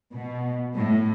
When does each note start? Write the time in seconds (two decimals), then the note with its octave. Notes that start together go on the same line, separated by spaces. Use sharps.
0.13 B2
0.75 A2